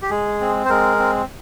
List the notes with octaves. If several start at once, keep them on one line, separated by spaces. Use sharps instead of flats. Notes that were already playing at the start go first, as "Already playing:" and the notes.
G4
G#3 G#4
C4
C5
G#3 A#4
C4